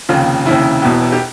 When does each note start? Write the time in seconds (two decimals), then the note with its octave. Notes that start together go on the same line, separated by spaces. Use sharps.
0.09 F1 D#2 C#3 F4
0.46 F1 D#2 C#3 E4
0.82 E1 E2 B2
1.13 G4